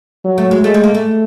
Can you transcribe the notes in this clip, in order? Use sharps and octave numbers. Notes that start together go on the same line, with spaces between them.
F#3
A3
G#3
G#3 A3
G3
A#3
A3